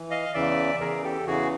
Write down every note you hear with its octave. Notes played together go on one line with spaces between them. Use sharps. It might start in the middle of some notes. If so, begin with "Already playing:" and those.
Already playing: E3
D#5 F5
E2 C#3 E3 D5 E5
E2 C#3 E3 G#4 A#4
G4 A4
E2 C#3 E3 F#4 G#4